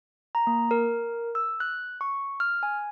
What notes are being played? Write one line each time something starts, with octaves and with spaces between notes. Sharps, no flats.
A#5
A#3
A#4
E6
F#6
C#6
F6
G#5